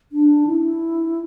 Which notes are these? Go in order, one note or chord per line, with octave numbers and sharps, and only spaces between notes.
D4
E4